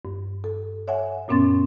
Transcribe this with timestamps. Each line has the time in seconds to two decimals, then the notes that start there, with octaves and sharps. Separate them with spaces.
0.05 G2
0.44 A4
0.88 C#5 E5 F#5 G#5
1.28 F#2 A#2 B3 C#4 C6 A6